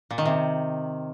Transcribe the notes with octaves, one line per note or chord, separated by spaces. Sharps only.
A#2
D#3
C3